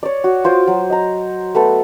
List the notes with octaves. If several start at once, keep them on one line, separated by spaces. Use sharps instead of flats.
C#5 D5
F#4
F4 C5 D6 D#6
F#3
D#5 A#5
A3 B3 A4